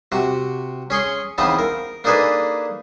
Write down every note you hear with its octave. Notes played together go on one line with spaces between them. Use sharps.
C3 F#4
C#4 G#4 C6 C#6
C#3 E3 B3 C4 D#4
A#4
A#3 D4 D#4 G#4 A4 B4